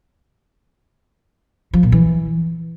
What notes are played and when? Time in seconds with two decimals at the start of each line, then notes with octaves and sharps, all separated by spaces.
1.73 F3
1.83 A#2
1.92 E3